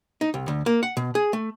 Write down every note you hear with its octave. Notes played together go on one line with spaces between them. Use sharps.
D#4
C2
D2
A#3
F#5
B2
G#4
A3